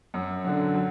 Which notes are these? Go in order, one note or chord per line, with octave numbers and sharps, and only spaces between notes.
F#2
D3 F#3
F#3